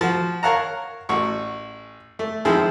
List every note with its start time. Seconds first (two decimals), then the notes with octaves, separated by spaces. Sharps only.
0.01 F3 F#4
0.43 A#4 C#5 F5 F#5 A5 A#5
1.09 A1 F#4 C#6
2.19 A3
2.45 D#3 F3 G#3 C4 E4 G#4